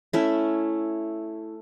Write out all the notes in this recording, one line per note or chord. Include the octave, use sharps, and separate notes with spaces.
A3 C#4 E4